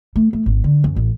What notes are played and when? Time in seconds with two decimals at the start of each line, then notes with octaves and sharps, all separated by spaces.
0.16 A3
0.33 A3
0.46 G#1
0.64 D3
0.84 F#2
0.96 A1